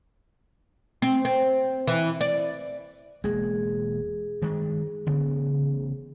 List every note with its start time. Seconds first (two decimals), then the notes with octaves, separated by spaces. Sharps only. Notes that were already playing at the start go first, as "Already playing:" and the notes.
1.02 C4
1.25 C4
1.88 E3
2.21 D5
3.24 E1 G#3 A#3 G#4
4.42 G2 D#3 G#3
5.07 A1 C#3 B3